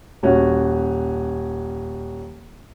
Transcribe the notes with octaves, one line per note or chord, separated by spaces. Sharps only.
D#1 C#4 F#4